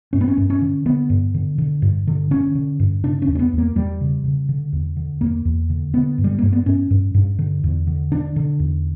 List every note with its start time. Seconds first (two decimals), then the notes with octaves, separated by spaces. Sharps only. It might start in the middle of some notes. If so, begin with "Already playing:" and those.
0.13 G2 C#4
0.21 B3
0.28 C#4
0.37 G2
0.50 C#4
0.62 D3
0.85 D3 B3
1.10 G2
1.34 D3
1.58 D3
1.82 G2
2.07 D3
2.31 D3 C#4
2.55 D3
2.80 G2
3.04 C#3 D4
3.22 C#4
3.28 E2
3.35 C#4
3.39 B3
3.53 E2
3.58 A#3
3.76 E2 G3
4.01 C#3
4.24 C#3
4.49 D3
4.73 E2
4.97 D3
5.21 E2 A#3
5.45 E2
5.70 D3
5.94 D3 B3
6.18 G2
6.24 G3
6.39 G2 A#3
6.53 B3
6.66 G2 C#4
6.91 G2
7.15 G2
7.39 D3
7.64 E2
7.87 D3
8.12 D3 D4
8.36 D3
8.59 E2